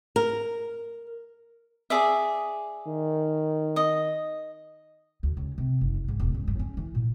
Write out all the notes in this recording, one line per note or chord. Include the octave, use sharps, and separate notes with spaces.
A#4
G#4 D5 E5
D#3
D#5
D2
C#2
C3
F#1
C2
G#2
E1
C#2
G2
C#4
E3
A#2